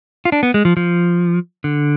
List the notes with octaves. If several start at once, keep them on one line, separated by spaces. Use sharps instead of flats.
F4
D4
B3
G#3
F3
F3
D3